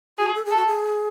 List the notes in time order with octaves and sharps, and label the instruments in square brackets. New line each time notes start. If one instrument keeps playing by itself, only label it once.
[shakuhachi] F#4 [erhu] G#4
[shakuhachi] A4
G#4
[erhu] A4
[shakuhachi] F#4
G#4